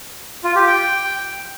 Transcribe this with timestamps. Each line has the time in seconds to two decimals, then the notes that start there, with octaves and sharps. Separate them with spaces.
0.44 F4
0.56 G4
0.67 G5